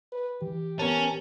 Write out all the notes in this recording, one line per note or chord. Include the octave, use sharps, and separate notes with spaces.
B4
E3 G4
B3 C#4 A#4 A5